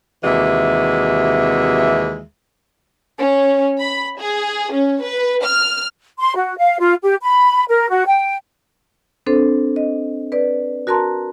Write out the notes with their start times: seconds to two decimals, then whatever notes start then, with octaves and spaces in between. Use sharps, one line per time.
0.24 D#2 C3 E3 G#3 F#4 E5
3.18 C#4
3.79 B5
4.18 G#4
4.72 C#4
5.02 B4
5.43 F6
6.19 C6
6.36 F#4
6.57 F5
6.79 F4
7.03 G4
7.22 B5
7.68 A#4
7.90 F#4
8.06 G5
9.26 C4 D4 A4 C5
9.76 D#5
10.32 B4 D5
10.87 F#4 A#4 A5 A#5 C6